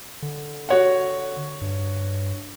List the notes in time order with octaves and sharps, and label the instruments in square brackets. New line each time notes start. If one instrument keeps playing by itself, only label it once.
[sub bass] D3
[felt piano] F#4 C#5 F#5
[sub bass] G2